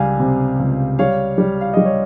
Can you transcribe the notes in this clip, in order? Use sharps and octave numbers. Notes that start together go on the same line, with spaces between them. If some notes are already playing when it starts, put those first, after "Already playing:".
Already playing: C#2 G3 F5 G#5
C3
C#2
G3 C#5 F5
G3
F5
G3 D#5
C#5